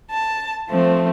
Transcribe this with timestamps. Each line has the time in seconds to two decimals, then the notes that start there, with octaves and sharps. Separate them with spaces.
0.10 A5
0.69 F3 A3 C4